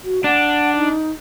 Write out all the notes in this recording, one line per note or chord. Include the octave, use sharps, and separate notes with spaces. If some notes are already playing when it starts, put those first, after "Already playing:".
F#4
D4 F#5
D#4